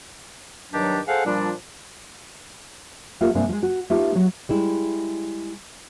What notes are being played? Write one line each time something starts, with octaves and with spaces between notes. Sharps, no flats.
G2 D#3 F#3 D4 G4
G#4 A4 C5 F5 F#5
A#2 F3 G3 D4
A3 A#3 F4 G4 A4 A#4
G2 C3 A#3 C4 D4 G#4
F3 G#3
F#4
A3 B3 D#4 F4 G4
F#3 F#4
G3 G#3 E4